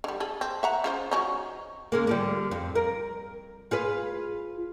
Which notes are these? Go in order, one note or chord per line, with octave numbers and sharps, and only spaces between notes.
D3 G3
G#4 A4
C4
E5 F#5 A#5
C#3 F4 C5
F#3 C#4 D#4
C#3 G#3 A#3
D3 F3 G3
F2
A#4
F4 G#4 B4